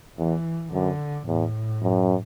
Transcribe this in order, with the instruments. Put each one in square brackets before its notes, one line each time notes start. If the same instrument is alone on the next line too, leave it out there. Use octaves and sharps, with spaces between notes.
[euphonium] E2 [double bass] E3
[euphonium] F#2 [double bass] D3
[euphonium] E2 [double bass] A2
[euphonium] F#2